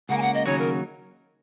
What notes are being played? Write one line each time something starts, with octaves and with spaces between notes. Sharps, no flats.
C#2 C#3 A#3 F#5
G#5
F#5
D#5
D#2 C#3 F#3 D#4 F#4 C#5
A#4